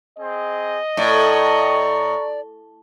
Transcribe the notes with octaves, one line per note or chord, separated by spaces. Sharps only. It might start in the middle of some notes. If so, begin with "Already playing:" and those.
C4 G#4 D#5
A2 D5 A#5 C#6